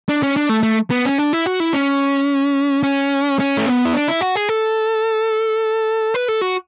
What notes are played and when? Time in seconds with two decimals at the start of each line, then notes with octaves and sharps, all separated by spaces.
0.09 D4
0.23 C#4
0.37 D4
0.49 A3
0.63 A3
0.91 B3
1.05 C#4
1.18 D4
1.33 E4
1.46 F#4
1.60 E4
1.73 C#4
2.83 C#4
3.40 C#4
3.57 A3
3.66 B3
3.85 E4
3.93 D4
4.08 E4
4.21 F#4
4.36 G#4
4.49 A4
6.14 B4
6.28 A4
6.41 F#4